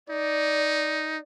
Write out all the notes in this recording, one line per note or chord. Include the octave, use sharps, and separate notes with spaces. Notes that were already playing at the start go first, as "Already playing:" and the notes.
D#4 D5